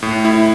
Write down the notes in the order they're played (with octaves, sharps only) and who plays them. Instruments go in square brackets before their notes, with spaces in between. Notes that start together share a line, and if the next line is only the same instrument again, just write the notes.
[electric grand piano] A2
E4